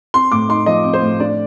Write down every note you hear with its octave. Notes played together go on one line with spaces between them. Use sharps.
C4 C6
A2 D6
D#4 C6
F3 D#5
C4
C5
A2
D4 D5